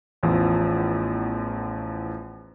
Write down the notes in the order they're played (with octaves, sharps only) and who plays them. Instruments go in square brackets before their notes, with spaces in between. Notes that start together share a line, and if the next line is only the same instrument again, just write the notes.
[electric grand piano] A1 E2 F3